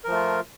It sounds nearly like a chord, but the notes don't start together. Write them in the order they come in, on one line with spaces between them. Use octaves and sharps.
A#4 F3 A3 F4